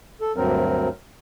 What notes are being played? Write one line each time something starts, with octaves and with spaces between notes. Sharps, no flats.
A4
D2 G2 F#3 C4 A#4